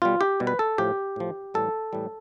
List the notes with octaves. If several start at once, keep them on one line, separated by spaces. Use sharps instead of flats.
B2 G3 F4
G4
B2 G3
B4
A4
A2 F3 G4
A2 F3
A2 E3 G3 A4
A2 E3 G3